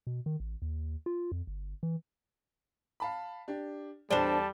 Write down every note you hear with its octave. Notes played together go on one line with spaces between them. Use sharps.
B2
D#3
A1
D#2
F4
F2
G1
E3
F5 A5 B5
D4 G4
E2 G3 C4 D4 A4 A5 G7